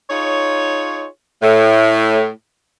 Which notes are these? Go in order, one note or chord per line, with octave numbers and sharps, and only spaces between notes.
D#4 F4 G#4 C#5
A2